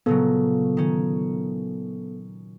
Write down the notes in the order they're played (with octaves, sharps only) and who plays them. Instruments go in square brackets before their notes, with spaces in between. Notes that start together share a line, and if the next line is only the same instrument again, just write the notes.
[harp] A#2 C#3 F#3 [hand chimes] B3 A4
[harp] D#3 C#4